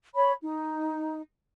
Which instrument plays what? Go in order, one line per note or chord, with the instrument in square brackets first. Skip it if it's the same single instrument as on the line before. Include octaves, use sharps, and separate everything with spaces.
[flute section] C#5 B5
D#4